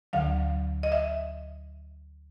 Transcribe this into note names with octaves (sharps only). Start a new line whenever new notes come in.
D2 D3 F#3 F5
D#5
E5